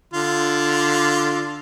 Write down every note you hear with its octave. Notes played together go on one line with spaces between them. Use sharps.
D3 F4